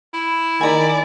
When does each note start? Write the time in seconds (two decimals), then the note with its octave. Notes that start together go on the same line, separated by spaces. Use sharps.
0.14 E4
0.61 D#3 D5 G#5 A#5 B5